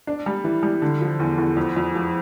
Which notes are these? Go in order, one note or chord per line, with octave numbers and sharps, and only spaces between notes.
D4
G3
E3
G3
D3
F3
E2
E2
F2
F2
F3